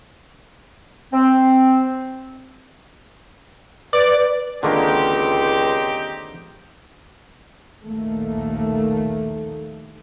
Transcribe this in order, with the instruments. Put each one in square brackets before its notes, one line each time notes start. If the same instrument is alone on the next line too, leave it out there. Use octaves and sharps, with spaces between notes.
[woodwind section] C4
[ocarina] B4 [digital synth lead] D5
[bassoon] C#2 [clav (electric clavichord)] D3 D#3 A#3 [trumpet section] C4 D#4 G4
[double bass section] A#1 D#2 D#3 A3 A#3